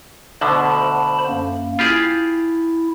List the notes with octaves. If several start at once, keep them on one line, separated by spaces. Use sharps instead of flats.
D2 B2 D3 C5 A5 B5
F#2 A#3
E4 F4 G4 G#4